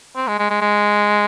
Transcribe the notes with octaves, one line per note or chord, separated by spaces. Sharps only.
C4
G#3
G#3
G#3
G#3